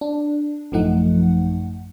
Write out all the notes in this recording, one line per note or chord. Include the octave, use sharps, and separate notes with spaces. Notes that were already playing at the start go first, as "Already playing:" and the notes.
D4
A1 F#2 F3 A3 D#4 F#5